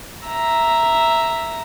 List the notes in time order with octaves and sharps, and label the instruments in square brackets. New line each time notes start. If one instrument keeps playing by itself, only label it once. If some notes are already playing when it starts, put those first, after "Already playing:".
[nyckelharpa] E5 A#5